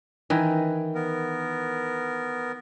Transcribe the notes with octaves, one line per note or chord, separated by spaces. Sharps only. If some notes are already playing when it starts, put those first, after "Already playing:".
D#3 E3
B3 A#4